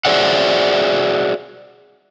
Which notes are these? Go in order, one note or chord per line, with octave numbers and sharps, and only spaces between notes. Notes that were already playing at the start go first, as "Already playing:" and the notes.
F#4 G#4 C5 D5 E5 F#5